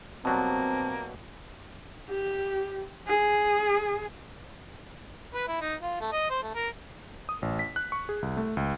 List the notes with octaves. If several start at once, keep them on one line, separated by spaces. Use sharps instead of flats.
B2 F#3 G3 A#3 C4 A5
G4
G#4
B4
E4
D#4
F4
A3
D#5
C5
A3
A#4
D#6
A1
B6
F#6
C#6
G#4
C2
A3
C#2